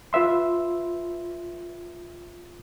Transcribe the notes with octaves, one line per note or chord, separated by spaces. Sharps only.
F4 B4 E5 C6